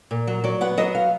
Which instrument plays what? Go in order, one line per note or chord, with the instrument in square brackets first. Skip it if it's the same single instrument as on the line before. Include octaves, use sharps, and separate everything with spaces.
[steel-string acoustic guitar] A#2
F#3
F#3 D5
B3 F#5
F#3 D#5
F5